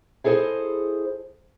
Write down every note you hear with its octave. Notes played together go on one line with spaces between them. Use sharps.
E4 G#4 A4 C5 D#5